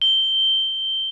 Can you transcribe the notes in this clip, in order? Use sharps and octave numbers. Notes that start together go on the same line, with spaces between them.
G7